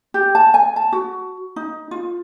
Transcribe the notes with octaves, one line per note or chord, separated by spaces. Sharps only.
G4
A5
G#5
A5
F#4
D#4
F4